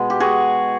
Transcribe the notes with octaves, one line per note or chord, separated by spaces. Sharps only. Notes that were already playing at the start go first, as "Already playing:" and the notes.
Already playing: B2 G#3
G4
F#4 G#4